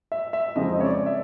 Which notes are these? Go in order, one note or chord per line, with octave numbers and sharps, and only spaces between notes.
E5
E5
F2 C#3 F3 G#3 C4 D#5
C#5
D5
E5